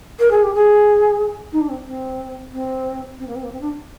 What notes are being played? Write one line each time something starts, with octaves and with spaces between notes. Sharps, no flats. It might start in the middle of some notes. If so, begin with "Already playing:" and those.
A#4
G#4
G4
G#4
D#4
D4
C4
C4
C4
C4
A#3
C4
A#3
C4
D4